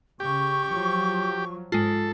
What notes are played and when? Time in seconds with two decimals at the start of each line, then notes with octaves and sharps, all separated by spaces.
0.20 C#3 G4 C#6
0.69 F3 F#3
1.72 G#2 G#3 F4 A4